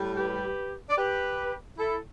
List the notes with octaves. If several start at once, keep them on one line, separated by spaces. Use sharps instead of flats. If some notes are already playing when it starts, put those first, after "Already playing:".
Already playing: A2 G3
G4 B4
D5
G4 B4
E4 A4